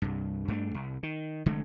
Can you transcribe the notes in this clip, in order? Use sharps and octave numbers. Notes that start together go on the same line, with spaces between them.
C2 G2
G2 A3 A#3 D4
C2
D#3
F1 D3 G#3 A3